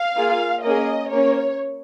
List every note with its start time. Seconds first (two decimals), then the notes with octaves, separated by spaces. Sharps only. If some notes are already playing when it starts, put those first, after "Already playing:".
Already playing: F5
0.17 A#3 F4 G#4
0.63 A#3 C#4 G#4 D#5
1.10 A#3 C#4 C#5